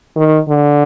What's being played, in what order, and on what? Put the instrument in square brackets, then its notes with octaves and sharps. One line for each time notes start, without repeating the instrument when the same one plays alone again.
[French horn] D#3
D3